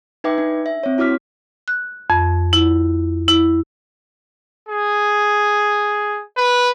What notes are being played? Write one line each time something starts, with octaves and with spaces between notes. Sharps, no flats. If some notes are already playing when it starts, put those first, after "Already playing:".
D#4 B4 E5 G5 D6
D4
E5
C4 C#5
E4 F#4 C#5 D6 F6 B6
F#6
F2
E4
E4
G#4
B4